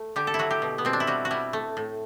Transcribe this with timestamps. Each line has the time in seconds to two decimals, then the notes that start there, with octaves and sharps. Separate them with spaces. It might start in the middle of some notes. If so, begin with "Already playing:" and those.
Already playing: A3
0.16 D3 G4
0.27 A4
0.34 E4
0.39 F#3 F#4
0.51 G4
0.62 B2
0.78 B3
0.85 B2 C4
0.93 D4
1.00 E4
1.07 G3 F#4
1.25 F#4
1.31 G3 E4
1.53 A3
1.77 A2